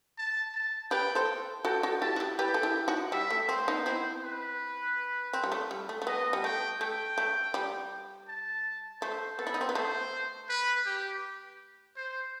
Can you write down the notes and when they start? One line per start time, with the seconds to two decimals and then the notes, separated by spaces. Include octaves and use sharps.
0.18 A5
0.55 A5
0.91 G4 B4 G5
1.15 A4 C5
1.65 F#4 A4 G5
1.83 F#4 A4
2.01 E4 G4 A5
2.16 F#4
2.20 E4 G4
2.39 G4 B4 G5
2.54 A4
2.63 E4 G4
2.88 D#4 F#4
3.12 G3 E5
3.31 A3
3.49 C4 C5
3.68 B3 D#4
3.86 C4 E4 C5
4.23 B4
5.33 C4
5.44 G3
5.52 A3
5.71 G3
5.89 A3
6.02 A3
6.07 B3 D#5
6.33 G3
6.44 A3 G5
6.80 A3 G5
7.18 A3
7.54 G3
8.29 A5
9.01 A3 C5
9.39 B3 A4
9.47 E4
9.54 D#4
9.61 C4
9.69 B3
9.75 A3 C5
10.49 B4
10.86 G4
11.97 C5